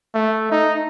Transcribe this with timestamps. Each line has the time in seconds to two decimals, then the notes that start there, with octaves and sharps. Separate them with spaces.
0.15 A3
0.51 D#4